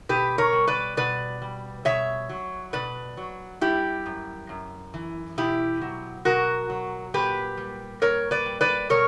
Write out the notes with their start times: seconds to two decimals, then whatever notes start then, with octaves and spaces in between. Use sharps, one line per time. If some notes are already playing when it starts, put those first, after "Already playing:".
0.09 B2 G4 B4
0.38 A#4 C#5
0.53 G3
0.67 B4 D5
0.97 B2 B4 D5
1.42 G3
1.85 B2 C#5 E5
2.29 F#3
2.73 B2 B4 D5
3.17 F#3
3.61 G3 E4 G4
4.06 F#2
4.49 F#2
4.94 E3
5.38 B2 E4 G4
5.81 F#3
6.25 B2 F#4 A#4
6.70 F#3
7.14 A#2 G4 B4
7.57 G3
8.02 A#2 A#4 C#5
8.31 B4 D5
8.46 G3
8.61 B4 D5
8.89 B2 A#4 C#5